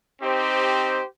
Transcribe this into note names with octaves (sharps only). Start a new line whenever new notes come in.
C4 D#4 G4 C5